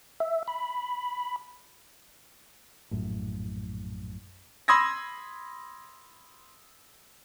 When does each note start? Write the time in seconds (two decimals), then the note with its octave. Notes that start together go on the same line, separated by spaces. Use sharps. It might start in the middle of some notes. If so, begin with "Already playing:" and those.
0.20 E5
0.48 B5
2.91 A#1 F#2 A2
4.68 B5 C6 D#6 E6 G#6 A#6